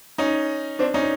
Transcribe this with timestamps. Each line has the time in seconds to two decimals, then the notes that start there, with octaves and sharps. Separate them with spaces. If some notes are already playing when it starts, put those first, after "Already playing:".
0.18 C#4 D#4
0.79 C4 D4
0.94 C#4 D#4